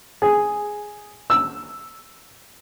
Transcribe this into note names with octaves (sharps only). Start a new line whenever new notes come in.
G#4
E6